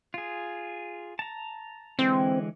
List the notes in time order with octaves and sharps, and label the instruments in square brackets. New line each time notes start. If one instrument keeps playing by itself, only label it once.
[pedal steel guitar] F4 G#4
A5 A#5
[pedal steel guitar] D3 E3 G#3 [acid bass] C4